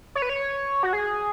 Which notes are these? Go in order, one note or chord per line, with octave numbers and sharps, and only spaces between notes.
C#5
B4
C#5
F#4
G#4